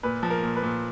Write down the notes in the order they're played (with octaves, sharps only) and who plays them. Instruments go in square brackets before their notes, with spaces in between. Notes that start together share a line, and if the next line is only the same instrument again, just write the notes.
[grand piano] A#2 B4
F3
A#4
A#2
B4
A#2